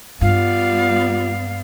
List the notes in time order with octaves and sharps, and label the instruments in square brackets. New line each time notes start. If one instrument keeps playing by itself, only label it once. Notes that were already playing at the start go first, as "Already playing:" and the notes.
[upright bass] G2 [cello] G3 B3 [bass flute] F4 [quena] F5